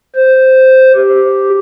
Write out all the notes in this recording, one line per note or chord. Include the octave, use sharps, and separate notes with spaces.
C5
G4